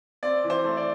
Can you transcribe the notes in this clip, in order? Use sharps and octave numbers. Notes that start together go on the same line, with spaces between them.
C4 D5
E3
C5
A3
D5